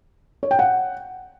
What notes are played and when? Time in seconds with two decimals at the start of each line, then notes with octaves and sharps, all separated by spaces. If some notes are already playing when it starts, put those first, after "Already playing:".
0.43 C#5
0.51 G5
0.59 F#5